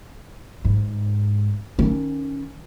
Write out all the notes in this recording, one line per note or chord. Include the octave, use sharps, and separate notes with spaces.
G#2
D#3 C#4